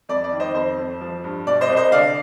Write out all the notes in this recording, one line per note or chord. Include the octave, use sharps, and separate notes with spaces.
F2 D5
D5
D#3
C5 D#5
F2 C5
F2
F3
G2
B2 D5
C5 D#5
C2
C5 D#5
D3 D5 F5